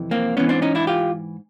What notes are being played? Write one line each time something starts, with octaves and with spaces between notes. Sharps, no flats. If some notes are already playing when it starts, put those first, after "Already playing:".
Already playing: F2 C3 E3
A#3 C4
G#2 E3 B3 C#4
C4 D4
C#4 D#4
D4 E4
F4 G4